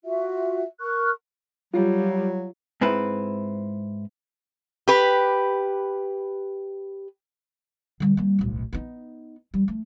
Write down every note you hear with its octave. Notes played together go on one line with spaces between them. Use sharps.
F4 F#4 E5
A#4 C#6 F6 F#6
F#3 G3 F4
G#2 C4 E4 B4
G4 B4
D3 G3
G3 A#3
D1 B1
B3 D#4
G3
A3